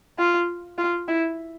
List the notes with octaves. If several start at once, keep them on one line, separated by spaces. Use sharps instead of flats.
F4
F4
E4